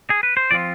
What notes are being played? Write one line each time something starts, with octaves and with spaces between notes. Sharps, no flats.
G#4
B4
C5
F3 C4 F4 D5